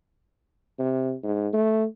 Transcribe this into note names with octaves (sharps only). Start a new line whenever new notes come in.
C3
G#2
A3